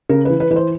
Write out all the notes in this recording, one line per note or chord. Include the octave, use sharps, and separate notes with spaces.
C#3 A#4
E3 B4
B4
E3 B4
C5